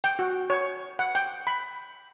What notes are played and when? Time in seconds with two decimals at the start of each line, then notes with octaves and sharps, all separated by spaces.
0.04 G5
0.19 F#4
0.50 C#5
0.99 F#5
1.15 G5
1.47 B5